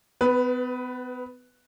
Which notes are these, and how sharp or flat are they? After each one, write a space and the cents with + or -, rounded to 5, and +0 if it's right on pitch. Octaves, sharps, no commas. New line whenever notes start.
B3 +35 B4 +0